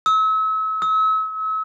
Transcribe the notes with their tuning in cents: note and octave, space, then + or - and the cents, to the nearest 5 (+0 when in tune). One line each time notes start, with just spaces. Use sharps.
E6 -35
E6 -40